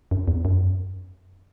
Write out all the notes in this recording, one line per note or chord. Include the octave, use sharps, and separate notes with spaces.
F#2
E2
F#2